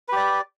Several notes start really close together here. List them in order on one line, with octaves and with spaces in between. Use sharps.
B4 G4 D5